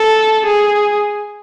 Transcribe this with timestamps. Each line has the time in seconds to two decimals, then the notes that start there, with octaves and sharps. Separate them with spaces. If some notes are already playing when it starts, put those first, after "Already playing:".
Already playing: A4
0.46 G#4